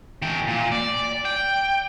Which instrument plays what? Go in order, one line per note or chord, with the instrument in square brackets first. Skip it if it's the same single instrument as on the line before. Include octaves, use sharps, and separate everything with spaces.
[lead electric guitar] E3 G5
A#2
D5
G5